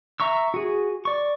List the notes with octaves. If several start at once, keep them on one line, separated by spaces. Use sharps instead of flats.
E5 A#5 C#6 E6
F#4 G#4
D5 C#6